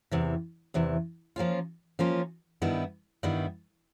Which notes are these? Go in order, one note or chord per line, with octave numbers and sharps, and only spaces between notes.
E2 C3 E3
E2 C3 E3
F3 A#3 C#4 F4
F3 A#3 C#4 F4
G2 D#3 G3 B3 E4
G2 D#3 G3 B3 E4